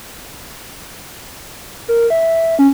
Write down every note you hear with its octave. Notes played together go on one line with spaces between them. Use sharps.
A#4
E5
C#4